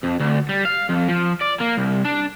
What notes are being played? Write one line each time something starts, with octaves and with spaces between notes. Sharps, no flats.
F2
D2
G3
F5
F2
F3
D5
A#3
C2
D4